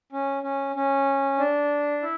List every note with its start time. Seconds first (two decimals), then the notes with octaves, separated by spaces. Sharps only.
0.12 C#4
0.43 C#4
0.76 C#4
1.38 D4
2.02 E4